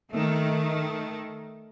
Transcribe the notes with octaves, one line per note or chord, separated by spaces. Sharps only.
D#3 A3